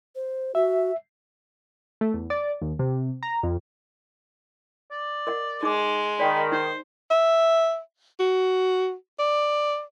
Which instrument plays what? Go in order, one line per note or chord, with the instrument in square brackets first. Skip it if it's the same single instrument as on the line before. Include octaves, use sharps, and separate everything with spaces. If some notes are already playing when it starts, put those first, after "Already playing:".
[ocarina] C5
[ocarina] F#4 [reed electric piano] E5
[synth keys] A3
E2
D5
D#2
C3
A#5
F2
[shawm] D5
[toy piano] A#4 D#5 F#5
[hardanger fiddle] G#3 [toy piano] D#4 D6
[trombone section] D#3 [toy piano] D5 G5 [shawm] B5
[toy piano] D#4 [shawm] C5
[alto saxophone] E5
F#4
D5